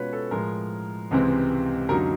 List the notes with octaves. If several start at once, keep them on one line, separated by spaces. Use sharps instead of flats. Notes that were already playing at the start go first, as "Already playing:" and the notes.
Already playing: B2 G#3 C#4 F4 B4 C#5
A4
A2 F3 G#3 A#4
C#2 C3 E3 G#3 C4
F#2 D3 F#3 A#3 D#4 A#4